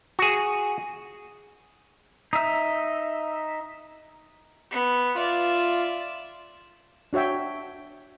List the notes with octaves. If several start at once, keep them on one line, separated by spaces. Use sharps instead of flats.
F#4 G#4
D#4 E5
B3
F4 D5 E5
D4 F#4 C#5 E5 G5